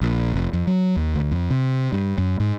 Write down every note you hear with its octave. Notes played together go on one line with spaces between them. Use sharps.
A#1
F1
F2
F#3
D#2
D2
F2
C3
G2
F#2
G#2